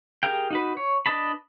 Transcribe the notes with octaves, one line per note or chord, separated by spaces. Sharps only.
G4 G#4 A#4 F5 G5
D#4 F#4 B4
C#5
D4 B4 D#5 A5 B5